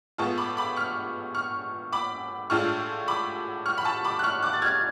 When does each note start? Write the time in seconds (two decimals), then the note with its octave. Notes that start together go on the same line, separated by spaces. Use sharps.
0.18 A2 G#3 B3 F4 A5 C#6
0.38 B5 D6
0.57 B5 D6
0.76 C#6 F6
1.35 C#6 F6
1.92 B5 D6
2.50 A2 G#3 D4 F4 C#6 F6
3.08 B5 D6
3.66 C#6 F6
3.78 B5
3.85 A5 C#6
4.05 B5 D6
4.19 F#6
4.24 C#6 F6
4.43 D6 F#6
4.53 A6
4.62 F6 G#6